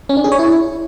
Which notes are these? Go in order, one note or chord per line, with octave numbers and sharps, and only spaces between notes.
C#4
D4
G#4
C#5
E4